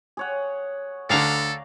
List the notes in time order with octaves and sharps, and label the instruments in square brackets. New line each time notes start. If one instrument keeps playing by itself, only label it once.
[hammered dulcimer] G#4 C#5 F#5
[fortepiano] D2 D3 [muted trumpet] A4 [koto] D5 F5 A#5